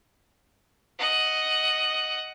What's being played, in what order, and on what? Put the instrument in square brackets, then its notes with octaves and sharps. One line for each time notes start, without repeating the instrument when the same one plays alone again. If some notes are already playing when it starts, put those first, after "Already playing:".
[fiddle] D#5 F#5